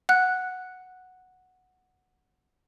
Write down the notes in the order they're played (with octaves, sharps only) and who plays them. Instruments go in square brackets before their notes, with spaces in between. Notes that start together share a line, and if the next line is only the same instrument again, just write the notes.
[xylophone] F#5 F#6